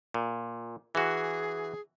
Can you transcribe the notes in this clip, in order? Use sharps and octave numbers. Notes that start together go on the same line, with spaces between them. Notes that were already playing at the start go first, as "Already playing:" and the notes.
A#2
E3 F#4 G#4